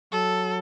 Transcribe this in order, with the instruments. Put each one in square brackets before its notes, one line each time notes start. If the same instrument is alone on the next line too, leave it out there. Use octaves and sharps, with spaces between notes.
[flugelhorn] F#3 [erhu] A4